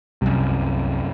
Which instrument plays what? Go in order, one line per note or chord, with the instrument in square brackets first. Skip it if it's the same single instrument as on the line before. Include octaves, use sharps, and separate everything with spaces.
[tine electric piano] C2 [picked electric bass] F#2 C3